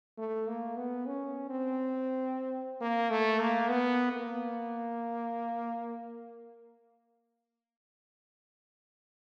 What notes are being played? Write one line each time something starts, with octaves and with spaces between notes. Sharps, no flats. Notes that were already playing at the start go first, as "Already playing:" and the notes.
A3
A#3
B3
C#4
C4
A#3
A3
A#3
B3
A#3